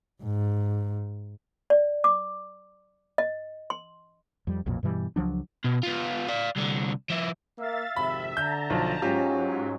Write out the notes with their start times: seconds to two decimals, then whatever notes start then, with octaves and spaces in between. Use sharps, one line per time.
0.23 G#2
1.70 D5
2.04 D6
3.18 D#5
3.70 C6
4.47 F2 G3
4.66 B1 F2 A#2
4.83 G2 B2 E3 G3
5.16 C#2 F3 F#3 D4
5.64 B2
5.83 B3 F4
6.29 D5 F5
6.56 C2 D3
7.10 F3 E4
7.58 A#3 E5 F5 A6
7.96 G#1 F2 C3 E5 B5
8.37 D3 A5 A#5 G6
8.70 B1 F3
9.02 G#2 F#3 C#4 F4 G4